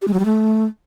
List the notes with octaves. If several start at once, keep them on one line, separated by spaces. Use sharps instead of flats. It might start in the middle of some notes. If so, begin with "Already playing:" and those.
G4
G#3
F#3
G3
A3